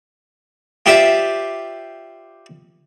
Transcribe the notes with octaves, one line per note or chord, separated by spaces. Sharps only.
F4 G4 C5 D5 E5